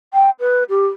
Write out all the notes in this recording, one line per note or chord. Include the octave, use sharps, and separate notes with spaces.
G5
B4
G4